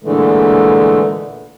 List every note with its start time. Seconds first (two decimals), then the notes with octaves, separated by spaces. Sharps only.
0.04 A#2 D3 E3 G#3 A3